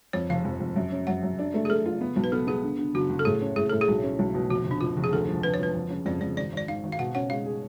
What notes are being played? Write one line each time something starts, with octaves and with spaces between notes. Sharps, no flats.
F2 C#5
F1 F5
F2
F2
F#2
C#4
F#2 F#5
F#2
D4
A3
G#4
A3 A4
F4
B3
B1
B4
B3 A4
B3 G#4
D3
D3
F#1 F#4
F#1
A4
A2 G#4
C#4
A2 G#4
A2 A4
G#4
B1
C#4
B1
B2
F1 F#4
F1
D4
F1 F4
F1
G#4
D2 A4
F3
D3 B4
C#5
F3 B4
F2
C#3
F2 D5
F2 D5
G#1 D5
G#1 D5
G#2 F5
G#1
F5
B2 F#5
C#4 F#5
G#3 F5
G#4